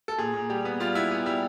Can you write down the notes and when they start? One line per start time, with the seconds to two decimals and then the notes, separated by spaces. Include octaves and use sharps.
0.08 A4
0.18 A#2 G#4
0.34 A#2
0.49 G3 G4
0.65 B3
0.80 G3 F4
0.95 B3 E4
1.11 B3
1.26 G3 E4